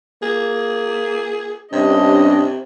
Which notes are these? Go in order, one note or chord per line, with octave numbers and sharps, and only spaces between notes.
A#3 G#4
G2 C3 C#4 D4 D#5